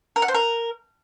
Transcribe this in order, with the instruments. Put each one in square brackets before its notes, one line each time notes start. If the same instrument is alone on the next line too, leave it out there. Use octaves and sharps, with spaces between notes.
[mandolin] A#4
F#5
C5
A#4